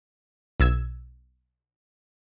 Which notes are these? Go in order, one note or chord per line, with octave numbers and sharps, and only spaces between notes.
B1 E6 G#6